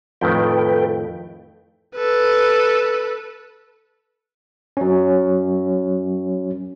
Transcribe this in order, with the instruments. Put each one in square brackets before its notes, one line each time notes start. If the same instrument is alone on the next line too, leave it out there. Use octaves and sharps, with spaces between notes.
[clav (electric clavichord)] F2 A2 D#3 [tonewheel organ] A4 B4 G5
[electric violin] A4 B4
[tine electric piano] F#3 C#4